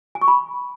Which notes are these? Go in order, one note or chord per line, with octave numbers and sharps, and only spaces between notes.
G#5
C#6
B5